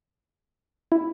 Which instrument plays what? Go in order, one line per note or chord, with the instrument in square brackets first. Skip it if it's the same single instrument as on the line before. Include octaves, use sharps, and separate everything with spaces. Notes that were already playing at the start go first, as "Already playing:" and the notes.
[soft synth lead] E4